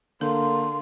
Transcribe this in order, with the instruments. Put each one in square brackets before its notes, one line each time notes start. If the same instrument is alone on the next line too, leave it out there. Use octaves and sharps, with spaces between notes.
[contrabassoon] D3 [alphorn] A#3 [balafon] A4 [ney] C6